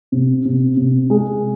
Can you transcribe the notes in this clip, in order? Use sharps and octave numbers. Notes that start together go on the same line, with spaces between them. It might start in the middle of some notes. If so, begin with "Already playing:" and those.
C3
C3
C3
G#3